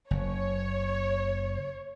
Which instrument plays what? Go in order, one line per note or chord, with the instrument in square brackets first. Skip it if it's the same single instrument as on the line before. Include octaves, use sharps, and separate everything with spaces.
[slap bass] F#1 [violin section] C#5